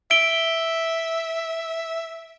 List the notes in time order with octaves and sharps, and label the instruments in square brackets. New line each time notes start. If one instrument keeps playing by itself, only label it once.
[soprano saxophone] E5 [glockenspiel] D7 G7